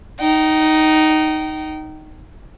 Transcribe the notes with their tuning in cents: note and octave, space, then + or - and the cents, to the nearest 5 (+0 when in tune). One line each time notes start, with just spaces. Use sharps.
D#4 +0 G5 -35